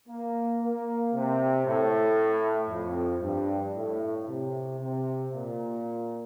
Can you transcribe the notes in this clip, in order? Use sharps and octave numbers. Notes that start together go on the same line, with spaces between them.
A#3
A#3
C3
A2
F2
G2
A2
C3
C3
A#2